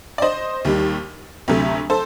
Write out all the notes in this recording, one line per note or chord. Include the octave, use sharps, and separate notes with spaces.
D5
C5 D#5
D#2 D#3 G3
D2 C3 F#3 A3
A4 C5